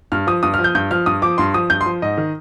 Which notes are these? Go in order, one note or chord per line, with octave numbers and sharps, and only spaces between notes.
G2 F6
F3 D#6
G2 D#6
F6
F3
G6
G2 G6
F3 F6
G2 D#6
F3 D6
G2 C6
F3 D#6
G2 G6
C6
F3
G#2 D#5
D#3